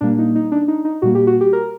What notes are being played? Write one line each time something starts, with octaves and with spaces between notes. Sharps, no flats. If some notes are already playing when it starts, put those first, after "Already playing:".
A#2 G3 A#3 D4
D#4
D#4
D4
D#4
D#4
A#2 G3 A#3 F#4
G4
F#4
G4
A#4